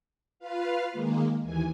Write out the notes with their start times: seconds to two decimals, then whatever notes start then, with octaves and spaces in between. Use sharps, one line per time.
0.39 F4 B4 F5
0.92 D#3 G#3 A#3
1.42 D#2 E3 G#5